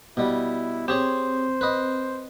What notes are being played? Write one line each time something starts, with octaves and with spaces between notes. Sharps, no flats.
B2 G3 E4
C4 G4 G#4 C5 C#5
B4 D#5